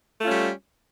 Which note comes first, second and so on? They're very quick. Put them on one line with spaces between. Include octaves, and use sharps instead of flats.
A3 F4 C#4 G3